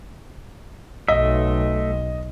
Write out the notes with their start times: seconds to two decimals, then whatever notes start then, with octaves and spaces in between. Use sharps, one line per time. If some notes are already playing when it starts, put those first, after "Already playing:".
1.08 B1 A3 D#5 E5